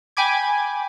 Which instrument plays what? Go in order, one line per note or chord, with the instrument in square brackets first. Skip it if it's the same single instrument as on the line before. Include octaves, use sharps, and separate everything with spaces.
[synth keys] G5 G#5 B5 D6 G#6